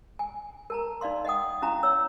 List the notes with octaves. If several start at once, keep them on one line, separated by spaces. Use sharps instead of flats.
G#5
A#4 A5 A#5
D#4 D5 F5 C6
D#5 F#5 G5 D#6
C#4 E4 F#4 F5 G#5 A#5
C#5 E6